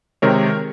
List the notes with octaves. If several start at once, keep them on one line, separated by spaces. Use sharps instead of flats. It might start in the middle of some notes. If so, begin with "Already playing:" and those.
C3 D#3 G#3 A#4 C#5